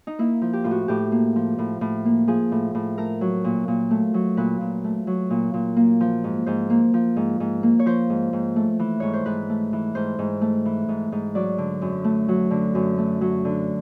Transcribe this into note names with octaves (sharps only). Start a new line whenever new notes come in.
D#4
A#3 E4
F3
G4
A2 F4
F#4
A2 G4
A#3
F3
A2
A2
A#3
F3 G#4
A2
A2
A3 A#4
F#3
A#2
A#2
A3
F#3
A#2 B4
A#2
A3
F#3
A#2
A#2
A#3
F3
G#2
G#2 C5
A#3
F3
G#2
G#2
A#3
C#5
F3 C5
G#2
G#2
A3
E3
G#2 C#5
C5
G#2 B4
A3
E3
G#2 C5
G#2
A3
E3
G#2
G#2
F#3 D5
D3
F#2
A3
F#3
D3
F#2
A3
F#3
D3